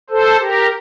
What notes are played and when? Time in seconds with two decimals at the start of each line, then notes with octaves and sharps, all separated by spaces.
0.10 A4 C5
0.40 G4 A#4